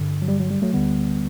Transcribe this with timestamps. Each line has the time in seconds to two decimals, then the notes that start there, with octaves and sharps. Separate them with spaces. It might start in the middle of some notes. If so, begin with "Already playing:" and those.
Already playing: G2 D3
0.22 F#3
0.28 G3
0.40 F#3
0.51 G3
0.62 F#3 A3
0.73 D2 D3 G3 B3